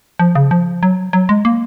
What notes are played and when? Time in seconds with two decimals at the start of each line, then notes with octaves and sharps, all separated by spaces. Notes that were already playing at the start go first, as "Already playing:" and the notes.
0.19 F3
0.35 C#3
0.51 F3
0.83 F#3
1.13 F#3
1.29 G#3
1.45 A#3